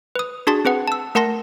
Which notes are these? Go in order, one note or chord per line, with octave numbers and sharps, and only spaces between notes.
B4 D#6
D4 F#4 G#4 A5 C6 A6
C4 G#4 B4 F#5
A5 E6
A3 A#4 F#5 A5 C6 A#6